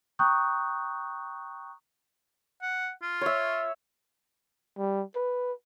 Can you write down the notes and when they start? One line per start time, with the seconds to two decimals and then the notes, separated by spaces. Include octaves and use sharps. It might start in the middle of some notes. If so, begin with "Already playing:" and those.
0.19 G5 A#5 C#6 D#6 F#6 G6
2.62 F#5
3.03 F4
3.21 C#5 E5
4.78 G3
5.15 B4